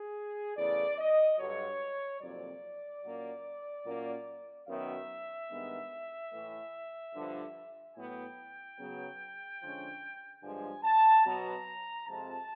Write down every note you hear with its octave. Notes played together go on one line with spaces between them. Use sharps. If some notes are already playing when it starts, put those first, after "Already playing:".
Already playing: G#4
E2 C#3 E3 A3 D5
D#5
G2 D3 F#3 C#5
F2 C3 D#3 F#3 A#3 D5
A#2 F#3 A#3 C#4
A#2 F#3 A#3 C#4
F#2 D#3 F#3 B3 E5
G2 D#3 G#3 B3
A2 E3 A3
G2 D3 F3
A2 F#3 B3 G5
C#3 F#3 B3
D3 F3 G#3 C#4
G2 D3 F3 G#3 G#5
A5
B2 F#3 B3 A#5
F2 C3 F3 G#3 A5